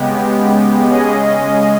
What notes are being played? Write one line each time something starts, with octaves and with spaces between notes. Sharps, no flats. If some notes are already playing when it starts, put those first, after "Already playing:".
Already playing: C#3 G#3 B3 G4
C#3 G#3 C#4 G#4 D#5